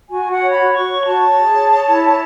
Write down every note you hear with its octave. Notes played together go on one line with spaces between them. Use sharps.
F#4 G#5
F#4
F#5
C#5
B5
F#4
F#4 C#6
C#5
F#4 A5
C#5
G#4
C#5
C#5
E4
C#5